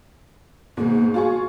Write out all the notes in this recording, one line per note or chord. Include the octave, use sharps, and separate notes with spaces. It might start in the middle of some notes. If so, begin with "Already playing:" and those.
G#2 B2 D#3 A#3
F4 F#4 G#4 C#6